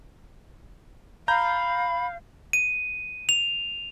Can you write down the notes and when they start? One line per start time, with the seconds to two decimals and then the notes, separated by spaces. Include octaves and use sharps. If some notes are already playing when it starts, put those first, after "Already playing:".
1.28 F5 A#5 B5 G6
2.53 D#7
3.29 F7